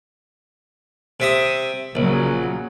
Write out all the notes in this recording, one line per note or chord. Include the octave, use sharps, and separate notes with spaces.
C3 E5 D#6
A#1 C#3 F#3